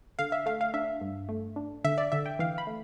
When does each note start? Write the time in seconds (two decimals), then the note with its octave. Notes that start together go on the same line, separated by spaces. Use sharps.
0.19 D3 F5
0.32 E5
0.46 A3 F5
0.61 F5
0.74 D4 E5
1.01 G2
1.29 A3
1.56 D4
1.85 D3 E5
1.98 D5
2.12 D3 E5
2.26 G5
2.39 E3 F5
2.58 B5
2.67 A3